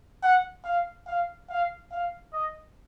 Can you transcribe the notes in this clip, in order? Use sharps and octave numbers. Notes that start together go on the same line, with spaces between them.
F#5
F5
F5
F5
F5
D#5